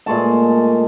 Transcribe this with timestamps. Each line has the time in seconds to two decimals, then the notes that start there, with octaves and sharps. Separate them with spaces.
0.06 A#2 G#3 A3 A5